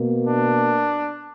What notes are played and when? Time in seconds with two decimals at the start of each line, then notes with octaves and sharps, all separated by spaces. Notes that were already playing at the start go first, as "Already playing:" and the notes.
Already playing: B2 A#3
0.26 D4